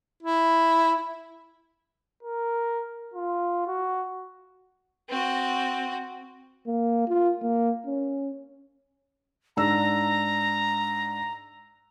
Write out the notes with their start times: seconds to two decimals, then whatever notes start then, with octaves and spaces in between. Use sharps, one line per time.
0.23 E4
2.23 A#4
3.14 F4
3.67 F#4
5.09 C4 F#4
6.67 A#3
7.08 F4
7.42 A#3
7.87 C#4
9.57 G#2 D4 A#5 E6